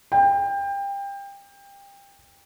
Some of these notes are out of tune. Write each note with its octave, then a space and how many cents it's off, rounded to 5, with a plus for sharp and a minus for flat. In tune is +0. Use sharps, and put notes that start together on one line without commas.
G5 +25